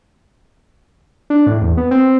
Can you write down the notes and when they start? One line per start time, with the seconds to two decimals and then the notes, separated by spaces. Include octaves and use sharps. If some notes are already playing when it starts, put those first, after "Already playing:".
1.30 D4
1.47 A2
1.62 E2
1.77 B3
1.91 C4